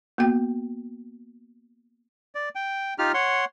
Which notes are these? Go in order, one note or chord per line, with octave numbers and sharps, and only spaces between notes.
A#3 B3 F#4 G5
D5
G5
D#4 F4 G4 F6
C#5 F#5 C6